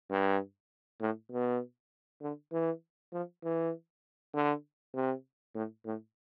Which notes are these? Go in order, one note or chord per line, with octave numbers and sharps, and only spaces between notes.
G2
A2
B2
D3
E3
F3
E3
D3
C3
A2
A2